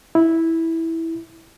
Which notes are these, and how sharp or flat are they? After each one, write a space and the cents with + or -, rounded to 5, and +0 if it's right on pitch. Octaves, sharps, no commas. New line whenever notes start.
E4 -10